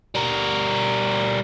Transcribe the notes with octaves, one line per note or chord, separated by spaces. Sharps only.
G3 A#4